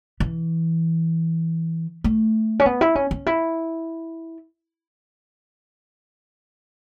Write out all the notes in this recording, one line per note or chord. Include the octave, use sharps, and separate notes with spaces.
E3
A3
C#4
B3
E4
C#4
C#4
E4